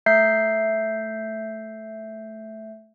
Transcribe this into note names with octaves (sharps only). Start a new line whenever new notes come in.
A3 E5 G6 C7